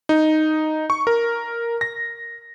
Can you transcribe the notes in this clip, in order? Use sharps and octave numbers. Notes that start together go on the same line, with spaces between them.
D#4
C#6
A#4
A#6